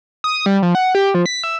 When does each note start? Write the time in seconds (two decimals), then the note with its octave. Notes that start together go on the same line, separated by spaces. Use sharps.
0.24 D#6
0.46 G3
0.62 F3
0.75 F#5
0.95 G4
1.14 F3
1.26 B6
1.44 E5